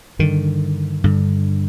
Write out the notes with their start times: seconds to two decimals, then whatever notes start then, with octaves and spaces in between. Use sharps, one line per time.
0.19 G2 D3 D#3
1.04 G2 D3